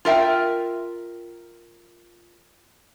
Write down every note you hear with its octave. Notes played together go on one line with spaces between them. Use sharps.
F4 A#4 E5 G5